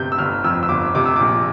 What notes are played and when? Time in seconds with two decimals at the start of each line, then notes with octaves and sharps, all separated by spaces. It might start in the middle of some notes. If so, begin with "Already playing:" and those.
Already playing: G1 C3 G6
0.12 E6
0.19 G1 F6
0.44 F2 E6
0.63 E6
0.69 G1 D6
0.95 C3 D6
1.05 E6
1.16 A#1 D6